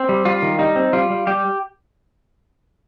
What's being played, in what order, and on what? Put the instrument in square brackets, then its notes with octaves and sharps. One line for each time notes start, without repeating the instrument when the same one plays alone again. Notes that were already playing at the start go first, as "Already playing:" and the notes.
Already playing: [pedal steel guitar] C4
G3
G3 F4
D#3
G3 D#4
C4
G3 F4
G3
G3 G4